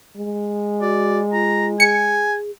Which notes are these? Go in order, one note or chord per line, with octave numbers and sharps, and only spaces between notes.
G#3
F#4 D5
F4 A#5
G#4 G#5 C#7